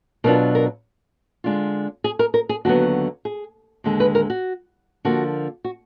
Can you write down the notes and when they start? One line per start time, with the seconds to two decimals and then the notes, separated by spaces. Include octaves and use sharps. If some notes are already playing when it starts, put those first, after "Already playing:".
0.24 B2 F#3 D4 F4 A#4
0.55 A#4
1.44 D3 G#3 D4 F4
2.04 G#4
2.19 A#4
2.34 A#4
2.49 G#4
2.65 D#2 D3 F#3 B3 F#4
3.25 G#4
3.84 D#2 D3 G#3
4.00 B4
4.15 A#4
4.30 F#4
5.05 D3 F3 A#3 F#4
5.64 F#4